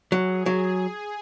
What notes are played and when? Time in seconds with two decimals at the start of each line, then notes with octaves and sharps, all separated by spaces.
0.12 F#3 G#4
0.46 F#3